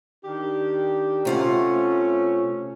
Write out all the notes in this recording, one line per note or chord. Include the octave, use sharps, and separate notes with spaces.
D#3 D4 G4
C3 A3 C#4 F4 F#5